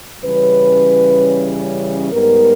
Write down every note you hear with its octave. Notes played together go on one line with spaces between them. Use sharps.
C#3 E3 G3 C#4 B4
G#2 G3 B3 A#4